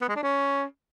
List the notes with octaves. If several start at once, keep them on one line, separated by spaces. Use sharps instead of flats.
B3
G#3
D4
C#4